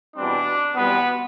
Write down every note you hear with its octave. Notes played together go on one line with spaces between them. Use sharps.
E2 B2 G3 C4 D4
E2 B2 G3 B3 C4 B4